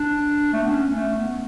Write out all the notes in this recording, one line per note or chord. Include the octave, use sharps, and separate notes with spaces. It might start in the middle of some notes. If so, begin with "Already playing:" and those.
Already playing: D4
A3
B3
C#4
A3
B3